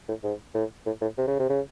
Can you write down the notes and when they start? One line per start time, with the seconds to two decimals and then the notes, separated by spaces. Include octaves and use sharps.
0.08 A2
0.24 G#2
0.54 A2
0.86 A2
1.02 A2
1.18 C3
1.27 C#3
1.39 C3
1.49 C#3